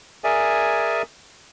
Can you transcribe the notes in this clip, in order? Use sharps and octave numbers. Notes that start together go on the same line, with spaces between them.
G#4 A#4 D5 E5 G#5